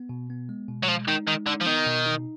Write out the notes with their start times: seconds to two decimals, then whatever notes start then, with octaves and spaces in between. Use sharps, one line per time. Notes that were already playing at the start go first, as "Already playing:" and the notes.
Already playing: B3
0.09 B2
0.30 B3
0.49 G#3
0.68 B2
0.83 F#3
0.88 F3 G#3
1.08 D#3 D#4
1.27 D#3 G#3
1.47 D3 D#4
1.61 F3
1.66 D#3 B3
1.86 B2
2.06 D#4